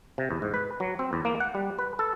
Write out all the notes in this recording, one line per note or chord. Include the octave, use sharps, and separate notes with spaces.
C3
E2
G#2
B4
F#3
C4
E2
A#3
F#5
G3
B4
A4